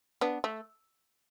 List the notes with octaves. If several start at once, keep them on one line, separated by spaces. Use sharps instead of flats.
B3 D4
A3